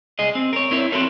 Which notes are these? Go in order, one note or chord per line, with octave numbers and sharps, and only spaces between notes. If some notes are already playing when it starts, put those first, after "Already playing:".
C2 G#4 D#5
C4
A#4 C#5
C4 E4 C#5
C4 E4 F#4 A4 A#4 C#5